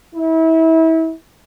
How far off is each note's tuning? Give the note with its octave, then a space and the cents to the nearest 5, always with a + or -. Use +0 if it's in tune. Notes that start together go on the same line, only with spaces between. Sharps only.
E4 -30